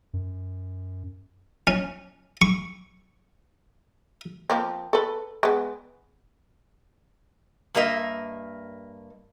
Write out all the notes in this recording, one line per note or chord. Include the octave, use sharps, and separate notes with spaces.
F#2
C#4
C#6
F3 A#3 C4
A4 B4
G#3 B3
G2 A#3 A#4 D#5 E5